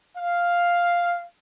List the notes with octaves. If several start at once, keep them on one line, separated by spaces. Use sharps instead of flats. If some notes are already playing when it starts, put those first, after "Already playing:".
F5